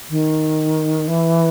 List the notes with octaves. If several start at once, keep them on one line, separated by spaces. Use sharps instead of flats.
D#3
E3